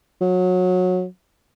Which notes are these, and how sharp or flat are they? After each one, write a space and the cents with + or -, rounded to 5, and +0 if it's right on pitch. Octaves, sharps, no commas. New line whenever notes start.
F#3 -20